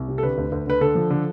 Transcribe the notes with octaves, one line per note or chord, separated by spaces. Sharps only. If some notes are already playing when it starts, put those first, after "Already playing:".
Already playing: C2
C3
A4
D3 B4
D2
D2
D3 B4
D3 A4
F3
D3